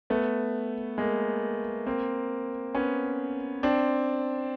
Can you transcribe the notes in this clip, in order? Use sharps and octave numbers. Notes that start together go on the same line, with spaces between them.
A3 B3
G#3 A#3
A#3 C4
B3 C#4
C4 D4